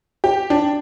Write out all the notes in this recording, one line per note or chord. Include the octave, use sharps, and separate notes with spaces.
G4
D4